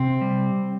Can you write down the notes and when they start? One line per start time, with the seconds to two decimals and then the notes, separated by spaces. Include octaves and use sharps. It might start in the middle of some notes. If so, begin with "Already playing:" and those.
Already playing: C3 C4
0.22 G3